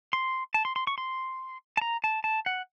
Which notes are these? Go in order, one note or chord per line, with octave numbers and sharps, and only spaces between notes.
C6
A5
C6
C6
C#6
C6
A5
A#5
A5
A5
F#5